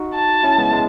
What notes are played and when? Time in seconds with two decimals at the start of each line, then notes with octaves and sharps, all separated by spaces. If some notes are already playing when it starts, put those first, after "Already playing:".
Already playing: D#4 F#4
0.15 A5
0.43 C#4 E4
0.58 G#3 B3
0.73 G#3